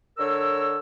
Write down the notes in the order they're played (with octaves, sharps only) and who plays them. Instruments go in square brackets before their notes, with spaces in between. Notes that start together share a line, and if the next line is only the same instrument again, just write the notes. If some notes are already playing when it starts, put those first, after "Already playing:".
[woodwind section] D3 A#4 C#5 E6